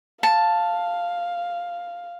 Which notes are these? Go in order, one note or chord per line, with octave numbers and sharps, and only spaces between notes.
F5 A5